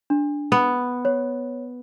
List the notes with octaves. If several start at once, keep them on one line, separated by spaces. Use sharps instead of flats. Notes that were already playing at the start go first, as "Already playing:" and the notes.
D4
B3
C#5